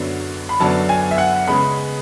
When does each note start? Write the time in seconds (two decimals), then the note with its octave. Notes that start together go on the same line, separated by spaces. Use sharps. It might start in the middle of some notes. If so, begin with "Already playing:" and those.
Already playing: F#2 D3 F#3 B3 D4
0.49 B5
0.60 F#2 D3 F#3 B3 D4 A5
0.89 G#5
1.11 E5
1.18 F#5
1.47 C#3 G#3 B3 B5